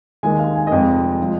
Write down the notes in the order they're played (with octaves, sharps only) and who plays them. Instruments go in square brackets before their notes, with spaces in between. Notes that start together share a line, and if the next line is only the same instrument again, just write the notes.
[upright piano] D#2 D#3 G#3 G#5
F5
G#5
D#5
F1 F2 F3 G#3 F5
F3 G#3